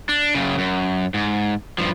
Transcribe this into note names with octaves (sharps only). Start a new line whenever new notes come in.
D4
F#2 C#3
F#2
G#2
G2 F3